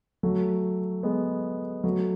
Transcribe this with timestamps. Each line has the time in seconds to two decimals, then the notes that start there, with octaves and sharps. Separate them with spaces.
0.23 F#3 A3
1.03 G#3 B3
1.84 F#3 A3